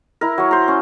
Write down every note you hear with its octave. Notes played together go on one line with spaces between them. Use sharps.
E4 A#4
F#3 C#5
C5 A#5
C#4